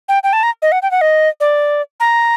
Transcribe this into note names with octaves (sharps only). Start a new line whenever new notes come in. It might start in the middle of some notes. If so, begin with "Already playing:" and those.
G5
G5
A5
A#5
D#5
F#5
G5
F#5
D#5
D5
A#5